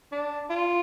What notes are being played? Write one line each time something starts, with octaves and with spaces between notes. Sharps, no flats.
D4
F4